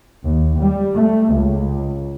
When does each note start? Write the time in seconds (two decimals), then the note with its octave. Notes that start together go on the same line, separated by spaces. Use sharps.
0.23 D#2
0.58 G3
0.95 A3
1.32 C#2